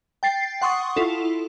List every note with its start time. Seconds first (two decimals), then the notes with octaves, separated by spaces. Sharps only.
0.23 G5 A6 C7
0.62 F#5 C6 C#6 D#6
0.96 E4 F4 A4